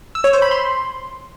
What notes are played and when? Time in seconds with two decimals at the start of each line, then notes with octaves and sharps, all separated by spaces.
0.15 E6
0.24 C#5
0.33 C5
0.42 B5
0.51 C6